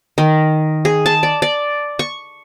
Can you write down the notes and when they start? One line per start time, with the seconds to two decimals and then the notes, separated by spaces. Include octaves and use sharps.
0.18 D#3
0.85 G#4
1.06 A5
1.23 D5
1.42 D5
1.99 C#6